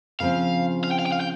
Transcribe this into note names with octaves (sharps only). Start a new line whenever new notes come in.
C#3 F3 C4 F5
F5
G5
F5
G5
F5
G5